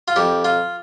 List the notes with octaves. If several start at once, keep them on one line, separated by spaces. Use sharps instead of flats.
F4
F2 G4
F4